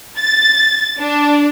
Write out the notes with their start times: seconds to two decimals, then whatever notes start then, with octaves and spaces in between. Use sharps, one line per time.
0.19 A6
0.99 D4